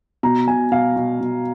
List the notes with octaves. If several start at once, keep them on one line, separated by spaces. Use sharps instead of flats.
B2 A#5
B2 G#5
B2 F5
B2
B2